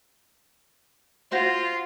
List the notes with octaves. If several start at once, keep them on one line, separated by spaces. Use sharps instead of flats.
F4 F#4 C5 C6